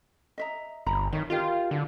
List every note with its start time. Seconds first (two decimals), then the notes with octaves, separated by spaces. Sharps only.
0.38 D#5 E5 A#5
0.87 G1 A#5 B5
1.13 D#3 C#5 E5
1.30 F4 G4 A#4 D#5
1.71 D3